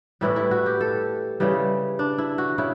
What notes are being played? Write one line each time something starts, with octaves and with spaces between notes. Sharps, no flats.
A2 E3 G3 E4
E4
F#4
G4
A4
C#3 E3 G3
D4
E4
F#4
C#3 E4